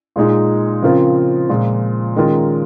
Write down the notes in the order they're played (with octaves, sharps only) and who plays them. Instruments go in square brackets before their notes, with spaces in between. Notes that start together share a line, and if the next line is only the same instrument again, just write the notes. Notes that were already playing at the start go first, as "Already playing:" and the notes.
[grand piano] A#2 G#3 D#4 G#4
C#3 F3 C4 F4 A#4
A#2 F3 G#3
D#3 G#3 C#4 F4 A#4